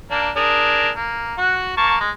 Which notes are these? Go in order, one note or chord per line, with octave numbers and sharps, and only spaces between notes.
A#3 D4
D4 G#4 A#4
A#3
F#4 F#5
A#3 A5 C#6
G#3